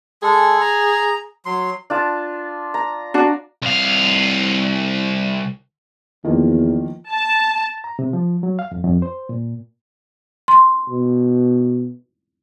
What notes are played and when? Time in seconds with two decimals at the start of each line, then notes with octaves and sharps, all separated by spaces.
0.23 G#3 G#4 A4
0.61 A#5
1.46 F#3 C6
1.90 D4 F4 A5
2.74 A#5
3.14 D4 F#4 D5
3.62 C2 F5
6.24 E2 D#3 F3 A#3
7.10 A5
7.84 A#5
7.99 C3
8.13 F3
8.43 F#3
8.59 F5
8.71 F2
8.85 F2
9.02 C5
9.29 A#2
10.48 C6
10.89 B2